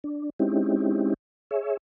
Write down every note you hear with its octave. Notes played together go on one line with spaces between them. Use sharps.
D4
G#3 C4 C#4 D#4 E4 G4
G#4 C#5 E5